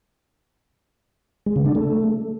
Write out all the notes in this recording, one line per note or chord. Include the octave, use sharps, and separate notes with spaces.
G#3
C#3
D4
A3